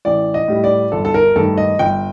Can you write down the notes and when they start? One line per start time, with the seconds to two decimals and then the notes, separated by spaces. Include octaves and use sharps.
0.05 A1 D5
0.34 D#5
0.48 A2 G3
0.64 D5
0.92 G1 A4
1.05 A4
1.14 A#4
1.36 G2 D#3 A3 A4
1.58 D#5
1.79 G1 G5